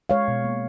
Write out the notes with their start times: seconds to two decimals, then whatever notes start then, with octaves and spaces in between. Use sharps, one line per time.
0.09 G#3 C#5 F5
0.28 B2
0.44 A#3